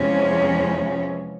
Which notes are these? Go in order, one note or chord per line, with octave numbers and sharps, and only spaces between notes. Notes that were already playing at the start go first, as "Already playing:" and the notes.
Already playing: E2 C3 F3 G#3 C#4